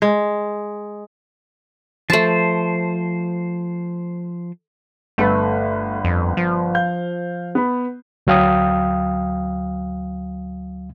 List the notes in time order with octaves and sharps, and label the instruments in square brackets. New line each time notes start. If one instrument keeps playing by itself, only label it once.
[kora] G#3
[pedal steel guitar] F3 C5 [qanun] A3 A5
[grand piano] G1 B4 [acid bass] A3
[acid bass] F2
F3
[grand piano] F5 G6
B3 B5
[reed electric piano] D2 F#3 F5 G5 D#6